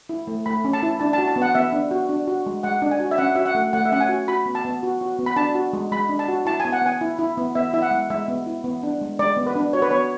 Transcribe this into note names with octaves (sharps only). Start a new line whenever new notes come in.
E4
A3
A3 B5
C#4
A5
E4
D4 A5
A5
F#4
A5
B3
F#5
B3 E5
D4
F#4
D4
F#4
G#3
G#3 F#5
D4
G#5
F#4
E5
C#4 F#5
F#4 E5
F#5
A3
A3 F#5
E5
C#4 F#5
G#5
F#4
F#4 B5
B3
A5
B3
F#4
F#4
B3
B5
D4 A5
F#4
G#3
G#3 B5
D4
A5
F#4
E4 A5
G#5
B3
F#5
B3 G#5
E4
E4
B3
B3 E5
E4 E5
F#5
G#3
G#3 E5
B3
E4
B3
D4
G#3
G#3 D5
B3
B4
D4
F#4 C#5
B4
B3 C#5